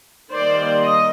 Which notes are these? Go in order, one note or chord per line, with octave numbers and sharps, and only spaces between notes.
D#3 G3 A#3 C5 D5
D#5